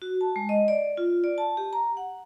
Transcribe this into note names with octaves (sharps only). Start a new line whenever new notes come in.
F#4
A5
G#3
D#5
D5
F4
D5
A5
G4
A#5
F#5